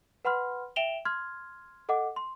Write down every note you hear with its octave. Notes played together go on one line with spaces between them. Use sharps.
B4 F#5 B5 C6 F6
E5 G5 D7 E7 F7 G7
C6 F6 G#6
A4 D#5 F#5 D6
C6